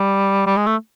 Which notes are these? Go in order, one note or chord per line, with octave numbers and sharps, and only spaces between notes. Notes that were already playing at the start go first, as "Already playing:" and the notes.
Already playing: G3
G3
G#3
A3